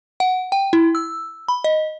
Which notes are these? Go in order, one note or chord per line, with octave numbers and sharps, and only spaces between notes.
F#5
G5
E4
E6
B5
D#5